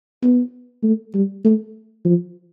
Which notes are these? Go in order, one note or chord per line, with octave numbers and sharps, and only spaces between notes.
B3
A3
G3
A3
F3